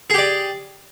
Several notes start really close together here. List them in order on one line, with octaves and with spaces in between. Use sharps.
G#4 G4 D5